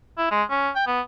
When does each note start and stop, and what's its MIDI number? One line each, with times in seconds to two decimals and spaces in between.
0.18 0.29 64
0.31 0.43 56
0.50 0.69 61
0.75 0.86 79
0.87 1.00 59